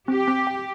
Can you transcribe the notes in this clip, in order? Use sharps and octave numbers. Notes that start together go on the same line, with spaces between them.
C4 G4
C4
G5